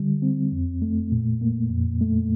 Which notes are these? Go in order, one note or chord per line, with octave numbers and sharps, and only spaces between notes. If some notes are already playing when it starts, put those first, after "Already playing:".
Already playing: D3 G3
C4
F2
A3
A#2
A#3
F2
A3